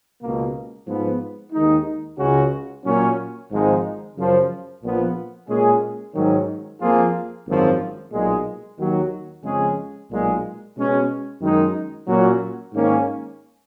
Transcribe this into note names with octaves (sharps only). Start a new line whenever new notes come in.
C#2 B2 A#3
G#2 F3 B3
D#2 D#3 G#3 D#4
C#2 C#3 G#3 C#4 F#4
A#2 F#3 C#4
G#1 G#2 F3 G#3 D#4
F#2 C#3 F3
A#1 A#2 F3 B3 F4
A#2 G#3 C#4 G#4
G#2 D#3 F#3 C#4
F2 F3 A#3 F4 G#4
G#1 F#2 F3
B1 A#2 G#3
D#2 D#3 F#3
F2 C#3 G#3 C#4 G#4
B1 A#2 G#3
B2 G#3 C#4
F#2 D#3 G#3 D#4
A#2 F#3 C#4 F#4
G#2 D#3 A#3 C#4